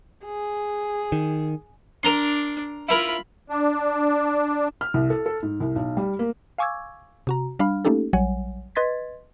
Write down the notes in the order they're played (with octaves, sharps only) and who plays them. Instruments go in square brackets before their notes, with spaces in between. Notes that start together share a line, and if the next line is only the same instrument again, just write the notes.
[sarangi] G#4
[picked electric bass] D#3
[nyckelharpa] D4 [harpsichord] A#4 A#5 C6
[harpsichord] E4 A#4 [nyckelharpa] F4 B5
[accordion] D4
[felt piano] F6
C2
A4
A4
G#2
C2
B1
G3
A#3
[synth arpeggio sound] F5 G#5 C#6 D6 E6 G#6
C3 F#4 A#5
G3 D4 F5 B5 F6
A3 A#3 C#4 D#4 G4 A4
A#1 F#3 G3 C#5 F#5 G#5
B4 D#5 C6 G#6 A6 B6